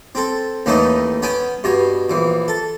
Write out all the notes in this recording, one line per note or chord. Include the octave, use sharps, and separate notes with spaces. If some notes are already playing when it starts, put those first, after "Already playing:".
C4 A4
D#2 A2 E3 A3 C#4 D#4
B3 C#4 G5 G#5
G2 B2 C#5
A#1 E3
A4